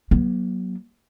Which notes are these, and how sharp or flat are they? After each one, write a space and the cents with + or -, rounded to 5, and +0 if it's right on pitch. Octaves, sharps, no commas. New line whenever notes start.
F#3 +5 A#3 +45